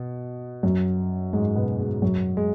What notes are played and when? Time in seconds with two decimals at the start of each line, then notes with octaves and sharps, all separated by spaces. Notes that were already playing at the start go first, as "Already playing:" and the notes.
Already playing: B2
0.63 F#2 F#3
1.33 G#2 G#3
1.56 B2 B3
1.79 G#2 G#3
2.02 F#2 F#3
2.37 G#3